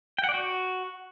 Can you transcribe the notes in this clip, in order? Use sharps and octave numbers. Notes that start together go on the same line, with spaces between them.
G5
F#5
D5
F#4